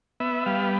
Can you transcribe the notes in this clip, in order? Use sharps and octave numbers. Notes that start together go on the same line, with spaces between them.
B3 E5
G3 F5